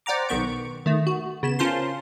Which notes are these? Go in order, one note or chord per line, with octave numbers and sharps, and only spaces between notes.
C5 D5 F#5 G5 A#5 D6
B1 D#3 B3 C#6 D7
D#3 A3
F#4
C#3 B3 E7
C#4 F4 A#4 C5 A5 C6